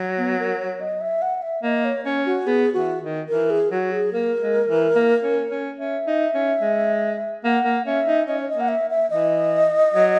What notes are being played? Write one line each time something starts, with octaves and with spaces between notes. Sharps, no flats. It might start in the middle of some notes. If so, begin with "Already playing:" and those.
Already playing: F#3
B3
A#4
C#5
D#5
E5
F#5
E5
A#3 D#5
C#5
C#4 C#5
F#4
B3 G#4
E3 F#4
D#3
E3 A#4
G#4
F#3 F#4
G#4
A#3 A#4
G#3
E3
A#3
C#4
C#4
C#4 E5
D#4
C#4
G#3
A#3 F#5
A#3
C#4 E5
D#4
C#4 D#5
C#5
D#5
A#3
F#5
E5
E5
E3 D#5
F#3